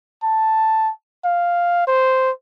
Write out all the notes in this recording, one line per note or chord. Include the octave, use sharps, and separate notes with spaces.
A5
F5
C5